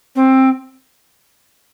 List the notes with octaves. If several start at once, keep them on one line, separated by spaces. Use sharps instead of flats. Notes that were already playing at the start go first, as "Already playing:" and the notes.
C4